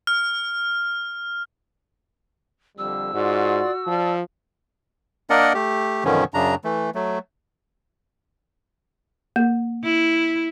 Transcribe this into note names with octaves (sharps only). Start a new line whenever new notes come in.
F6
F2 D3 G3 E6
G#2 F4 F#4 D5 C6
F3 D5 A5
A#3 D4 A#4 D5 D#5 F#5
A3 G4
F#2 B2 D3 D#3 F3 C#4
F#2 C#3 D4 A#5
E3 A3
F#3 A3
A#3
E4